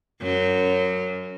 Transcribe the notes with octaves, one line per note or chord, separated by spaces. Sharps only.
F#2 F#3